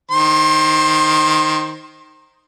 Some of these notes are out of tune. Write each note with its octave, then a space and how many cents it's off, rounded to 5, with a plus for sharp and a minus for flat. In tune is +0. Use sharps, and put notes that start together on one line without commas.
D#3 +0 C5 +10 C6 +40